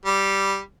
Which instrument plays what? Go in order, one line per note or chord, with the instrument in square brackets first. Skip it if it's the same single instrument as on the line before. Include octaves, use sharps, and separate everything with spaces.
[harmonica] G3